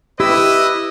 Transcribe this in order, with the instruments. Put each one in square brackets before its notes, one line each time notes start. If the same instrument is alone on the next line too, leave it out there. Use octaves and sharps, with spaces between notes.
[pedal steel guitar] E4 [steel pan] G4 [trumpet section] B4 D#5 [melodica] E6